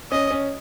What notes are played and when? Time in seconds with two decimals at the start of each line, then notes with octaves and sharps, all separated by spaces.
0.11 C#4 D#5
0.31 C#4